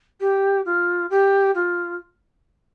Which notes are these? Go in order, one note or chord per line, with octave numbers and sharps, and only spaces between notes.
G4
F4
G4
F4